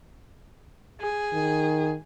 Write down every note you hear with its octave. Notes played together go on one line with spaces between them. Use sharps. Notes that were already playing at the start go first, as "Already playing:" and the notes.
G#4
D#3